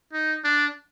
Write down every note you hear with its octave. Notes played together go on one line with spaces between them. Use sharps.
D#4
D4